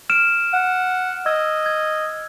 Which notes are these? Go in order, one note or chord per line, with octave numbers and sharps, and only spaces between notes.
F6 D7 E7
F#5
D#5 E6 G#6
G#6